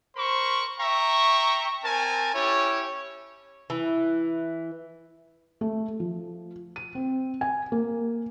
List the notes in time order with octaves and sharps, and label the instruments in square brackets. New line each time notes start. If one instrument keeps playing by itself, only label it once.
[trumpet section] A#4 C5 B5 C#6
E5 G5 A#5 C#6
C4 A#4 G#5 A5
C#4 E4 G4 C#5
[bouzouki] E3
[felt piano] A3
F3
D#7
C4
G#5
A#3